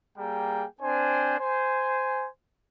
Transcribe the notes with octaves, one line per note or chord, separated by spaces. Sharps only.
G3 A#3 G#4 G5 A#5
C4 D4 C5 G#5
C5 G#5